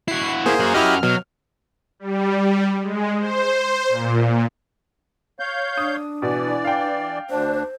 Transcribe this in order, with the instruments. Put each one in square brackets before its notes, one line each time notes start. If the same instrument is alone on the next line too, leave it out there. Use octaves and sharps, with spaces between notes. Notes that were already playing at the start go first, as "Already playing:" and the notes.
[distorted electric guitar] E4 F#4 [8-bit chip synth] C7
[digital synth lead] A#3 [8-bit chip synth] G#4 C5
[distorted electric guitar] F#2 F#4
[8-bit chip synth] E4 G4 D#5 [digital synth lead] F6
[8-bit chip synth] B2 [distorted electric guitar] F#3
[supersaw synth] G3
G#3
C5
A#2
[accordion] C#5 F5 G6
[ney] D4 [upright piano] D#6
[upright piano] B2 [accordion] E3 D5
[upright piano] F5 G5
[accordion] D2 D4 [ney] C5